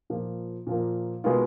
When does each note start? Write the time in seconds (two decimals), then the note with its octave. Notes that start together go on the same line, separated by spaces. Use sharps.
0.10 A#2 F3 A#3
0.67 A#2 F3 A#3
1.24 B2 G#3 B3 F4 A#4